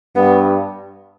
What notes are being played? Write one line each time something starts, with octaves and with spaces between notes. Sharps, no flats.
G2 B3